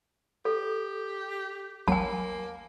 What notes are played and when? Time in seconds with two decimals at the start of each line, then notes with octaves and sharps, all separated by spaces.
0.45 G4 A4
1.88 A1 D#2 F#3 A#3 G#5 A5